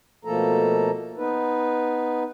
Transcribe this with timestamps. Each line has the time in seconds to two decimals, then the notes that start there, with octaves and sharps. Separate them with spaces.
0.25 B2 F3 A3 A#3 A4 A#5
1.17 B3 D#4 B4